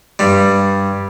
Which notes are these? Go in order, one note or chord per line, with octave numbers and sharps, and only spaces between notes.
G2 G3